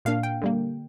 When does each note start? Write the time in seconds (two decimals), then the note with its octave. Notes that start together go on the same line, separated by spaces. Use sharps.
0.05 A#2 A#3 D4 F5
0.23 G5
0.42 D3 G3 A#3